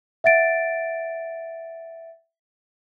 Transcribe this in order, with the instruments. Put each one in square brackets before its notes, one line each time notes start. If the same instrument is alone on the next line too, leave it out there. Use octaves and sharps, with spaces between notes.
[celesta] E5 F#5 A6 D7